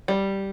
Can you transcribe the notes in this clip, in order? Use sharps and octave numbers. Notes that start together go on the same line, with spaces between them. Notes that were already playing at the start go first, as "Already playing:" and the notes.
G3